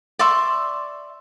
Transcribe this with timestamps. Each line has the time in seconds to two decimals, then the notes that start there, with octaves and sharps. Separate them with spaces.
0.19 D5 E5 C6 C#6